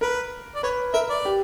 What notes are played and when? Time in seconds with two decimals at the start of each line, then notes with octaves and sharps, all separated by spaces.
0.01 A#4 B4
0.55 D5
0.63 B4 C#5
0.94 A#4 E5
1.10 D5
1.25 G4